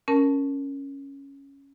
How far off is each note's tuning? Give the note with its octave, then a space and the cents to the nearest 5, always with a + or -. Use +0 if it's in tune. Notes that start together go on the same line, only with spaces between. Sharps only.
C#4 +0 A#4 +0 A5 +0